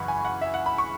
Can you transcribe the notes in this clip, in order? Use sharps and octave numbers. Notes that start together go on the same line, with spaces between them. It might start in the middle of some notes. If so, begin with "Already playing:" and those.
Already playing: F#2 C#3 E3 F#5 B5 C#6
G#5
F#5
E5
F#5
B5
C#6